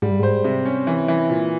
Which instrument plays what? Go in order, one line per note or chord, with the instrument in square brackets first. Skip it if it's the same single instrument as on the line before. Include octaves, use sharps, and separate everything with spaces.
[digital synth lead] G#2 [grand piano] G3
[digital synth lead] G2
[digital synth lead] G#2 [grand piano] C5
[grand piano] C3
C#4
E3
E3
A#2